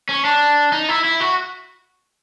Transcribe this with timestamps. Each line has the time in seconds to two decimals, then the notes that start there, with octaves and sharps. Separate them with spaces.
0.09 C#4
0.24 D4
0.72 D#4
0.89 E4
1.05 E4
1.20 F#4